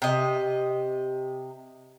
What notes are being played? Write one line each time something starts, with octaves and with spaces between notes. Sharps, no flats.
C3 D#5